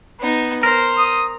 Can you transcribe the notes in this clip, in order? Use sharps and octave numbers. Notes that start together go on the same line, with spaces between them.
B3 D#4
A#4 C5
D#6